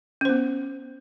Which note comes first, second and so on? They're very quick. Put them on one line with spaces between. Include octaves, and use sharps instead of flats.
C#4 C5 B3